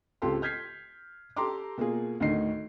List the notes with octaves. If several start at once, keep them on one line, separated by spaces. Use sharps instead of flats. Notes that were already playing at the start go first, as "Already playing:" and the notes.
C#2 C4 F4 G4 A4 C6
F6 G6 G#6 B6 C7
G4 A4 A#5 C6 D6
B2 A#3 F4 G#4
D2 A2 D#3 D#5 C7